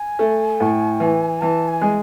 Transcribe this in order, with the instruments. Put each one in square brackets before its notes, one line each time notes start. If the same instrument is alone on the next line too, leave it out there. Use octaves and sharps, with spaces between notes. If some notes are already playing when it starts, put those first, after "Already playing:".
Already playing: [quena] G#5
[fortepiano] A3
A2
E3
[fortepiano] E3 [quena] A5
[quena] G#5
[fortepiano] G#3